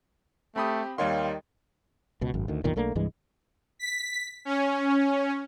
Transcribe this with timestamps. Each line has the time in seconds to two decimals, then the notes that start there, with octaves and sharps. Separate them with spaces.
0.56 A3 C4 G4 B5 D#6
0.98 D#2 D#3 G3 C#5 F5 C6
2.21 C#2 B2
2.34 G#1 F#2
2.48 D2 D#3
2.64 B1 E2 A#2 D#3
2.76 B1 A3 A#3 D4
2.95 C2 G2 E3 G#3
3.79 B6
4.45 C#4